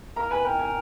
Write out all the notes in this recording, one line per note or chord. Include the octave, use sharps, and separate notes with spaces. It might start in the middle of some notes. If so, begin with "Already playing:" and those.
A#4 A#5
B4 G#5
A#4 G5
G#5